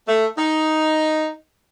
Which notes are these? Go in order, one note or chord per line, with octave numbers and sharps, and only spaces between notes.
A3
D#4